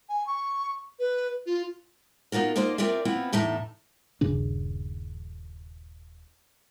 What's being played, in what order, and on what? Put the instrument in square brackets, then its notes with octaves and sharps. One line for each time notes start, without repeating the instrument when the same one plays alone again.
[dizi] G#5
C#6
B4
F4
[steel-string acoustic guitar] B3 D#4 F4 F#4 A#4
A#3 D#4 F4 C5 D5 D#5
C4 F4 A#4 D5 E5
B3 C4 E4 F4 F#5
E2 A2 D#4 E5 A5
[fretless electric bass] D#1 G2 C#3 D4